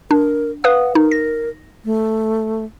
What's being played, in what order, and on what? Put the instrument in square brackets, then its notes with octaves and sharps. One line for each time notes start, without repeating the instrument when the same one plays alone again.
[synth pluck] D4 [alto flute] A#4
[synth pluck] B4 F5 D#6 [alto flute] F#5
[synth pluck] D#4 [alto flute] A#4
[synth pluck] A#6
[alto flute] A3